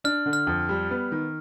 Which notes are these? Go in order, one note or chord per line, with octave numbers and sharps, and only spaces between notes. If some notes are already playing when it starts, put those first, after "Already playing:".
D4 F6
D3
F6
F2
G3
B3
D#3